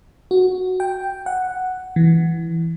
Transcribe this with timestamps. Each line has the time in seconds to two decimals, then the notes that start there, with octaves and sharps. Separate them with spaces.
0.31 F#4
0.80 G5
1.26 F#5
1.96 E3